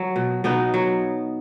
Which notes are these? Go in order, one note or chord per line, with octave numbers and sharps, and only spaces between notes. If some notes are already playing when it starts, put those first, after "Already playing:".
Already playing: F#3
B2
B2 B3 D#4
F#3